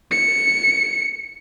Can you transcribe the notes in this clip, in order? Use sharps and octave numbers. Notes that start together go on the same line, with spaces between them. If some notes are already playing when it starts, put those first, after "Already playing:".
C#7